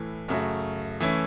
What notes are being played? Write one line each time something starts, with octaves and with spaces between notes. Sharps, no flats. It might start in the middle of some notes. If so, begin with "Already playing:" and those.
Already playing: A2 E3 A3
F#2 C#3 A3 F#4
E3 A3 C#4 E4